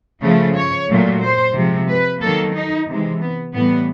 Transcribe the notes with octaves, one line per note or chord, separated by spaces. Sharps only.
C#3 F3 A3
C#5
A#2 F#3 A3
C5
C3 F3 G#3
B4
D#3 F#3 A#3 A4
D#4
C3 E3 G#3
B3
A2 E3 G3 B3